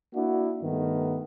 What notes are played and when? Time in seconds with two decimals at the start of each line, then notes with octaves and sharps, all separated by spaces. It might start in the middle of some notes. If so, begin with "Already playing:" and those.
0.13 A#3 D4 E4 F#4
0.62 G2 D#3 A3 B3